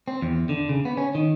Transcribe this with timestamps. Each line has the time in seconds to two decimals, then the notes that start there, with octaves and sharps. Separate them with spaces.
0.08 C4
0.22 E2
0.49 D3
0.69 C#3
0.85 B3
0.97 C#4
1.15 D#3